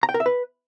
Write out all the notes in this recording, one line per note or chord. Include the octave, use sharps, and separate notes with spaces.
A#5
G5
A#4
E5
B4